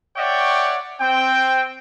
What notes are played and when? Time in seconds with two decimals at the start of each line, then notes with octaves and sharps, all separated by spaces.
0.17 C#5 D5 E5 F#5 G5 C#6
1.01 C4 G5